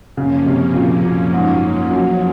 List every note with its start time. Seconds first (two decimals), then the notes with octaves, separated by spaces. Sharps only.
0.17 F#2 C#3 F3 A#3 C#4
0.46 C3
0.74 A#2
1.03 A#2
1.33 G#2
1.90 F#2